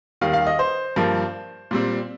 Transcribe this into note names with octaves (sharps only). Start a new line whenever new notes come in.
D#2 D#3 G3 F5
F5
D#5
C5
G2 F3 A#3
A#2 G3 C4